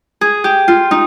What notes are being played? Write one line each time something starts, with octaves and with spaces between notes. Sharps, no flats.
G#4
G4
F4
D#4